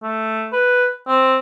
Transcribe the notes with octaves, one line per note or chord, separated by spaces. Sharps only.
A3
B4
C4